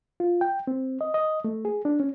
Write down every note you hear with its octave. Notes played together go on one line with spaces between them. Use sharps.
F4
G5
C4
D#5
D#5
A3
G#4
D4
C#4